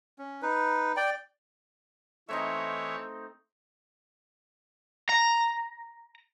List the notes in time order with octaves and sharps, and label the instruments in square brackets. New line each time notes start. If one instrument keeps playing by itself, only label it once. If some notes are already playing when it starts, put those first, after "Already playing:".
[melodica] C#4
D#4 B4
D5 G5
[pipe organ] E3 C#5 E5 [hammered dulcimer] A3 C4 D#4
[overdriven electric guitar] A#5